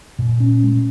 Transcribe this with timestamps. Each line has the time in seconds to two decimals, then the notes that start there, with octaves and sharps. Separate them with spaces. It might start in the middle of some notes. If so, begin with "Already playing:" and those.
0.19 A#2
0.40 C#4
0.63 G#3